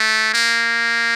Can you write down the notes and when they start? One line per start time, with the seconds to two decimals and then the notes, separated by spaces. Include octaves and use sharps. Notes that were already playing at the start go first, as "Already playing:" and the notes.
Already playing: A3
0.34 A#3